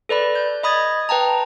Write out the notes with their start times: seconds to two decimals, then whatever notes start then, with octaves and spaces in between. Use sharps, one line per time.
0.09 A4 B4 D5 B5
0.35 G6
0.63 D#5 B5 D#6 G#6 A6
1.09 B4 G5 A5 A#5